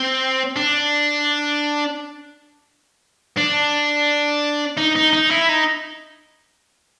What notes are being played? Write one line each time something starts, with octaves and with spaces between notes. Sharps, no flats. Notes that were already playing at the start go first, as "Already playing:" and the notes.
Already playing: C4
D4
D4
D#4
D#4
D#4
E4
D#4